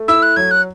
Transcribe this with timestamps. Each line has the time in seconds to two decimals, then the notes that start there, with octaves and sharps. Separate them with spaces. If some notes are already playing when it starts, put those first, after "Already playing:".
Already playing: A3
0.08 E4 E6
0.23 F#6
0.36 F#3 G#6
0.51 F#6